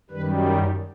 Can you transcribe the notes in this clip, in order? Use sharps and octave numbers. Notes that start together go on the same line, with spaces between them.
F#2 D#3 G3 B4